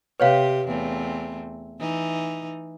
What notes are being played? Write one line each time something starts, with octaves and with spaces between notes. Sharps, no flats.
C3 G4 B4 C#5 F5
E2 A3 C4
E3 D#4